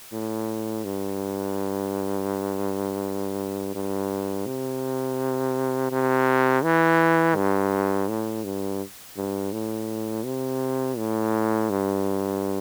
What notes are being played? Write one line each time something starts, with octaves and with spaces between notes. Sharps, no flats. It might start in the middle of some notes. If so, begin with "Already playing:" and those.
A2
G2
G2
C3
C3
E3
G2
A2
G2
G2
A2
C3
A2
G2